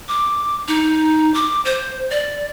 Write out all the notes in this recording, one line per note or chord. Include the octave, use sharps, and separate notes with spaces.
D6
D#4
D6
C5
D5